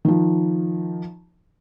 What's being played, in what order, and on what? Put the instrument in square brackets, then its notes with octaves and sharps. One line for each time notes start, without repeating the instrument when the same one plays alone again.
[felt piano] D#3 F3